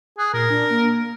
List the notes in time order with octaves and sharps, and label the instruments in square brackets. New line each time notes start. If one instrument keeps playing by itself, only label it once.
[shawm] G#4 [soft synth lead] F#6
[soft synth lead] A#2 [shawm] A#4
[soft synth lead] D4
A#3